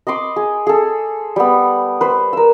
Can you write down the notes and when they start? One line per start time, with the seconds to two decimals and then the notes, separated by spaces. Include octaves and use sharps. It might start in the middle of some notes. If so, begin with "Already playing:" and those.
0.07 D#5 B5 C6 D6
0.36 G#4
0.67 G#4 A4
1.36 G3 B3
2.01 B4 C5
2.33 A#4 E6